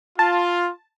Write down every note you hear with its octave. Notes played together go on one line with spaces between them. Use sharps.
F4 A5